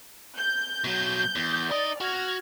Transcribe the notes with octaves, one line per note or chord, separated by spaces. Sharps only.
G6
B2 F#3
E2
D#4 D5 D#5
F#4 F6 G#6 A#6